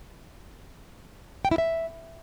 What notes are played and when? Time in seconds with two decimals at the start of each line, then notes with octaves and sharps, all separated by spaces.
1.45 G5
1.51 E4
1.58 E5